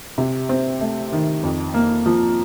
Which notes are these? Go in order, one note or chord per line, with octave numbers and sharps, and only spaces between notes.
C3
C4
A3
D#3
F2
A#3
F3